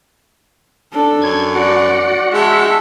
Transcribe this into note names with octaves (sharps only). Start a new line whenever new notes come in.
D4 A4
F#2 G#6
F#4 D5 F#5
G#3 E5 A5